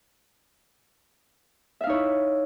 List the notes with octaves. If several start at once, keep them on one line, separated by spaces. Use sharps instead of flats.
D#4 E4 C#5 E5 F5